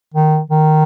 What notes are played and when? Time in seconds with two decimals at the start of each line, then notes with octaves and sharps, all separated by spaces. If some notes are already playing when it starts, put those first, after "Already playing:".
0.14 D#3
0.50 D#3